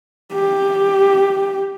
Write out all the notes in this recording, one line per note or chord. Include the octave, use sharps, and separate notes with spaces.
G4